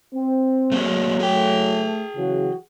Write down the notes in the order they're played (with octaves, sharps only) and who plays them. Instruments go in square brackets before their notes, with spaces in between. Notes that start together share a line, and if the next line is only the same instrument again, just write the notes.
[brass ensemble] C4
[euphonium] F#3 [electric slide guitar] A3 A#3 G#4
[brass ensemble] A3 [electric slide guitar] G#4 G5
[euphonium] C#3 [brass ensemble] E3 F#3 F#4